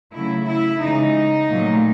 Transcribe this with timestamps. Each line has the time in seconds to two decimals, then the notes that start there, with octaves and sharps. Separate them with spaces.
0.13 C#3 F#3 A3 E4
0.47 E4
0.82 C#3 E3 G#3 D#4
1.50 A#2 F#3 A3